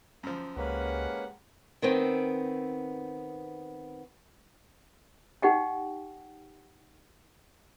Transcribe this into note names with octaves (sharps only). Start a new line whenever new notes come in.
F#2 F3
C#2 G#3 A#3 C#4 G4 B4 F#5
D#3 B3 C4
D#4 G4 F#5 G5